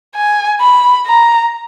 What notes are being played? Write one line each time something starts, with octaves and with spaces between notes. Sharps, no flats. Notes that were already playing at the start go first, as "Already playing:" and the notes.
G#5
B5
A#5